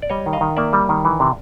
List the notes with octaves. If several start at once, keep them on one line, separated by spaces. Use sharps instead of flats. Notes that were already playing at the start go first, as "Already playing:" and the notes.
D5
G3 C#5 D#5
D#3
D#5 F5
D#3
A#3 D5 E5
G3
D#3
E3
C3